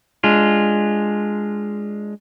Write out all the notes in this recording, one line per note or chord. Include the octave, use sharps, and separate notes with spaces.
G#3 D4 F4